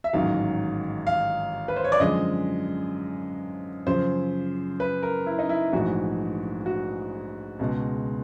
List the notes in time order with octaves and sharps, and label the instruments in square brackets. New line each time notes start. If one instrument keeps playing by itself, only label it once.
[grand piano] E5
A1 G#2 D#3 F#3 F5
F5
B4
C5
C#5
D5
F#2 D3 F3 G#3 D#5
F#2 C#3 F3 C5
B4
A#4
E4
D#4
E4
A#1 G#2 E3 A3 F#4
F#4
C#2 B2 G#3